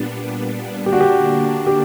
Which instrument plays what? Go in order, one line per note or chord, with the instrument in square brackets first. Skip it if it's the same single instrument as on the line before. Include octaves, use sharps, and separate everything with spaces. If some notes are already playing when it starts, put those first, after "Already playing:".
Already playing: [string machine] A#2 G3 B3 D4
[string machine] D3 A#3 D4 [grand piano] G4
[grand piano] F#4
G4
G4